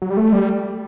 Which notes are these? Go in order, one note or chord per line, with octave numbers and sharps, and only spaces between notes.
F#3
G3
A3
G3